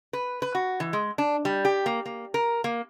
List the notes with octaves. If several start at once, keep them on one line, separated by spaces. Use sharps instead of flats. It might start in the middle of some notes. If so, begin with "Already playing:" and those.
B4
B4
F#4
E3
G#3
D4
G3
G4
A#3
A#3
A#4
A#3